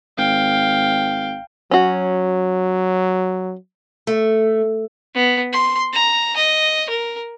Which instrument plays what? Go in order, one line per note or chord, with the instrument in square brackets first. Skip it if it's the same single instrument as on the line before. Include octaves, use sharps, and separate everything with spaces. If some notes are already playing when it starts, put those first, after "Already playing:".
[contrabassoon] G#1 [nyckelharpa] F5 G5
[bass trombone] F#3 [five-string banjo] C#4 F#4
[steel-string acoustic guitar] A3
[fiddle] B3
C6
A#5
D#5
A#4